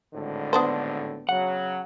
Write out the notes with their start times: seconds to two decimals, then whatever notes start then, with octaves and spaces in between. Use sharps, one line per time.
0.15 G#1 A2 D3
0.53 B3 D4 C5
1.29 C#3 F#3 F#5